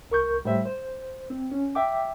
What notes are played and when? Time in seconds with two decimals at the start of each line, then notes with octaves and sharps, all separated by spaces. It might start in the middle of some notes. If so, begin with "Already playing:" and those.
0.10 C2 A#4 C#6 G6
0.45 A2 G3 A3 C5 E5
0.66 C5
1.30 C4
1.52 C#4
1.75 E5 G5 D6